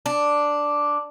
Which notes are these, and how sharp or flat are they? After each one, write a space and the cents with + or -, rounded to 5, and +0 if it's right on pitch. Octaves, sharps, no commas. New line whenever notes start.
D4 +0